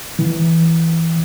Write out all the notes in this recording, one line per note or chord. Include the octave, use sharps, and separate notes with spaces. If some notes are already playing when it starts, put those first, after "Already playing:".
E3